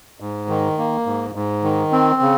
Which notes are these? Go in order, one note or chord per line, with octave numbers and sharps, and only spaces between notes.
G#2
D#3
A#3
G#2
G#2
D#3
C4
C#3